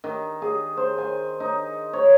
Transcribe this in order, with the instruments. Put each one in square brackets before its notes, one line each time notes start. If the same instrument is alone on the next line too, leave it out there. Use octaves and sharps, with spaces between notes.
[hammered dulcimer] D#3
G#4
C5
G#5
D#4
C#5